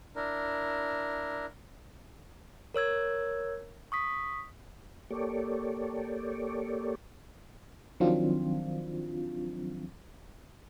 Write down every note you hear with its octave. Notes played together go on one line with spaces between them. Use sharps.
D4 E4 A#4
A#4 C#5 E6 G#6
C#6 D#6 B6
A#3 G4 A4 C#5 D5
D#3 F3 F#3 C4 D4 F4